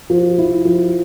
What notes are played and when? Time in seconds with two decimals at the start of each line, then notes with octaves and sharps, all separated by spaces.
0.10 F3
0.38 E4
0.65 F3